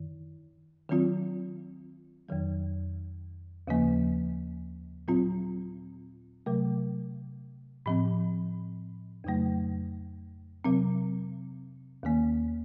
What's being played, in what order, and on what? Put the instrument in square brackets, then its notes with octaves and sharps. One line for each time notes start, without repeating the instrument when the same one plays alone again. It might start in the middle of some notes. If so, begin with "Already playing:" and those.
Already playing: [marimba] F#2 D#3
D#3 F#3 C4 F4
F2 D#3 F#3
D#2 C#3 F3 A#3
A#2 F#3 C4 F4
C3 F#3 A3
A2 F3 C4
F2 C#3 F#3 A3
C3 F#3 C4
D#2 D#3 A#3